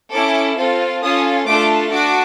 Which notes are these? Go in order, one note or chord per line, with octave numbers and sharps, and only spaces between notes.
C#4 E4 A4 D6
C4 F4 A4
C#4 F4 A4 D#6
A3 D4 F4 A4 D6
D4 F#4 D6